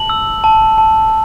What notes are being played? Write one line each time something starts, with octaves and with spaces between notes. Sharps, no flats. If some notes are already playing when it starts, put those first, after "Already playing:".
Already playing: A5 F#7
E6
A5
A5